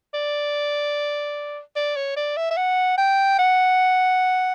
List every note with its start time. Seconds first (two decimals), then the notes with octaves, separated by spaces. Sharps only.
0.14 D5
1.76 D5
1.96 C#5
2.16 D5
2.37 E5
2.51 E5
2.57 F#5
2.98 G5
3.38 F#5